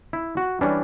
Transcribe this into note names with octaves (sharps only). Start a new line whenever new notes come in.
E4
F#4
E3 G3 C#4 D4